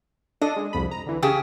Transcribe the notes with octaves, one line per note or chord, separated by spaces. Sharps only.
D4 A4 D#5
G#3
C2 F2 B5
A#5
D3 E3
C#3 G4 G#4 E6